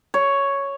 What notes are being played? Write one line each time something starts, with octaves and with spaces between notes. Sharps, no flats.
C#5